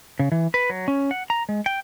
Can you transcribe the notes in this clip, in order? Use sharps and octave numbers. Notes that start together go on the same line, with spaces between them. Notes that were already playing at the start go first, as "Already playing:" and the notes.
C#3
E3
B4
F#3
C#4
F#5
A#5
G#3
G5